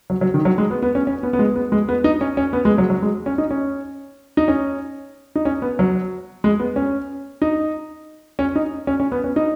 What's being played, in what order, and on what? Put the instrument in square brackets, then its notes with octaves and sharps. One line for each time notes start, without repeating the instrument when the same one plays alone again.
[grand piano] F#3
F#3
D#3
F#3
G#3
B3
B3
C#4
C#4
B3
B3
G#3
B3
G#3
B3
D#4
C#4
C#4
B3
G#3
F#3
F#3
G#3
C#4
D#4
C#4
D#4
C#4
D#4
C#4
B3
F#3
G#3
B3
C#4
D#4
C#4
D#4
C#4
C#4
B3
C#4
D#4